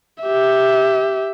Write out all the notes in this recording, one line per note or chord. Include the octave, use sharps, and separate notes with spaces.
G4 E5